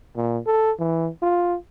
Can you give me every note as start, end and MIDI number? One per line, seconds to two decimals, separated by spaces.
0.16 0.38 46
0.46 0.71 69
0.79 1.09 52
1.22 1.56 65